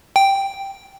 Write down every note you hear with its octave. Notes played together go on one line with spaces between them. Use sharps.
G5